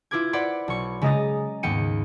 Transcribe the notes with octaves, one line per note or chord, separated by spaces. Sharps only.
E4 F4 B4 D6 G#6
B4 C5 D5 F#5 B5
B1 C#6
C#3 G#3 D#5 A#5 D#6 A6
D#2 G#2 B3 G5 C#7 D#7